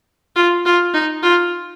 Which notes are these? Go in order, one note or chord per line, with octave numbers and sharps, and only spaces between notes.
F4
F4
D#4
F4